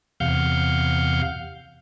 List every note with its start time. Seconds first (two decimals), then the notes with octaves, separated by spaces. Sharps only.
0.20 E2 C3 F5 F#5 F6 G6